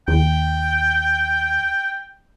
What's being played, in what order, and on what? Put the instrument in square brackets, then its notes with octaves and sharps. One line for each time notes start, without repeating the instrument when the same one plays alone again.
[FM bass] D#2 [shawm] G5